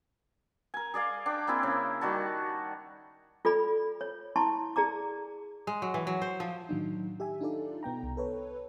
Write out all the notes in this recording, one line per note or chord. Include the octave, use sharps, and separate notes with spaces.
A#4 G#5
G#4 D5 D#5 F5
D4 G5 D6
A#3 C4 E4 G#4
C#3
D#3 G3 F#4 A5
F4 A4 D5 B5
C#5
E4 A5 C6 C#6
G#4 D5 A#5 D6
G#3
F#3
E3
F#3
C5
F3
A2 D#3 F#3 D4 D#4
G4 E5 G#5
D4 D#4 F4 A4 D5
B2 B3 G5 A#5
C2
A4 B4 C#5